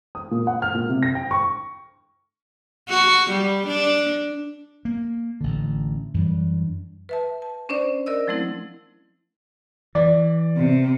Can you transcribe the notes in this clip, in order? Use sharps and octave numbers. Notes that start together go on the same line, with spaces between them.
D#6
A#2
F#5
F6
A#2
C3
A#6
G5
C#6
F#4
G3
D4
A#3
A1 D3
F#2 E3 G3 D4
B4 E5 A5
A5
C#4 D4 C5 D5
A#4 D5 D#5 E6
F3 F#3 A3 C4 E4
E3 D5
C3